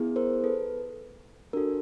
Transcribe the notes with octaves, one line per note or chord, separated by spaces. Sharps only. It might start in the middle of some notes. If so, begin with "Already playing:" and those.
Already playing: B3 E4 G#4
A#4 C5
A4 B4
D4 F#4 A4 A#4